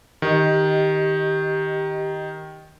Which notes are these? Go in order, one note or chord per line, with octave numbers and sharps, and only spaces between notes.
D#3 G4 D#5